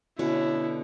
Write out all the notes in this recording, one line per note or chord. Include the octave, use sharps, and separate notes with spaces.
B2 D3 C#4 E4